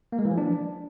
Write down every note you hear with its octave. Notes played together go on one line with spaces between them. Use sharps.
A#3
G#3
E3
F3
D4